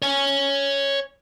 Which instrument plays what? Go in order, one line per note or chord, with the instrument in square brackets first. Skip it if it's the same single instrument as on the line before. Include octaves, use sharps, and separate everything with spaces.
[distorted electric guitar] C#5 G#5